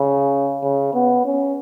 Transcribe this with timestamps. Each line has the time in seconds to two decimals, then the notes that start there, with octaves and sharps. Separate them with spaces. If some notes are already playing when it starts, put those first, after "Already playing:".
Already playing: C#3
0.63 C#3
0.94 B3
1.25 C#4